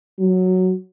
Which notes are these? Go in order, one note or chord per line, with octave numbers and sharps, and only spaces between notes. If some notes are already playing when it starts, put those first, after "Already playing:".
F#3